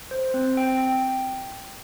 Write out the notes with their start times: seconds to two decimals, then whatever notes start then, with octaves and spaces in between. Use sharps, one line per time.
0.11 C5
0.34 C4
0.57 G5
0.80 G5
1.03 G5